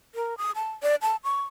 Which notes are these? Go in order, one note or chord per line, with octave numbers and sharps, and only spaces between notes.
A#4
D#6
A5
D5
A5
C#6